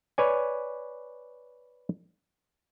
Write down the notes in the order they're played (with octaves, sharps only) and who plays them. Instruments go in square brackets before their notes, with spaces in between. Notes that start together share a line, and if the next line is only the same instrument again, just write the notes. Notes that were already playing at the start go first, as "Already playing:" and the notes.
[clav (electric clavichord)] B4 C#5 D5 G#5